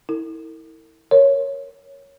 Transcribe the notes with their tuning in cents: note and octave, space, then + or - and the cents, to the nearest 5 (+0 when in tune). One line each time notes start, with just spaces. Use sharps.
E4 -25 A#4 -45
A#4 +5 C#5 +0